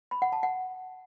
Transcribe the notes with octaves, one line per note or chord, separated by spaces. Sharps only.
B5
F#5
A5
F#5